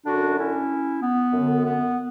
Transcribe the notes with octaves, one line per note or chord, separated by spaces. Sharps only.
F#2 D3 D4 F#4
C#4 E4
B3
F#2 D3
B3